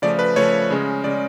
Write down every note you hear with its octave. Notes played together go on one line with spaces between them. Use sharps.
C#3 F3 A3 D5
B4
C#3 F3 A3 C#5
C#3 G#3 C#4
C#3 G#3 C#4 D5